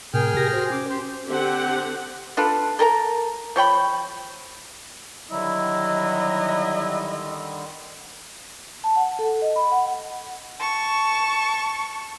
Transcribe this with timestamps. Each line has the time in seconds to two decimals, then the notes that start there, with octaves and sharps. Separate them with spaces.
0.14 A2 C3 G#4 A#4 G5 F6
0.37 G4 G#5 A#6
0.53 F#4 C5
0.72 C#4 D6
0.89 G4 C5
1.27 D3 C4 G4 F#5
2.37 D4 F4 A4 B4
2.79 A4 A#4 G#5 A#5
3.56 F3 C#5 G5 B5
5.31 D3 D#3 F#3 G3 E4 D#5
8.84 A5
8.96 F#5
9.19 A4
9.42 D#5
9.56 B5
9.72 F#5
10.59 A5 C#6